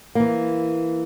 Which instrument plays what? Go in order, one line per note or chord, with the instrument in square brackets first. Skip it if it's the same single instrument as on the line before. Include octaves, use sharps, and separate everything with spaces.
[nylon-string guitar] E3 A#3